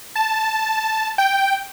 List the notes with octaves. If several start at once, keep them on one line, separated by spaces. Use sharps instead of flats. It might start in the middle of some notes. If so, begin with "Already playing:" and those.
A5
G5